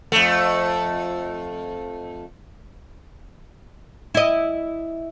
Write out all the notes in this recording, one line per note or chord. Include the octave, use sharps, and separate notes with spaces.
F2 A3
E4 D#5